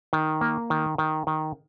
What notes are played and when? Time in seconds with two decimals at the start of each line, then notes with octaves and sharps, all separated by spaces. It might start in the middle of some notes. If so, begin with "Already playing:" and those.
0.13 D#3
0.41 A#3
0.70 D#3
0.98 D#3
1.27 D#3